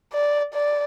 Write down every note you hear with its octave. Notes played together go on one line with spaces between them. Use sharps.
D5
D5